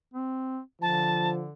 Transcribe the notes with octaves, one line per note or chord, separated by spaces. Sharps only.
C4
D3 F3 A5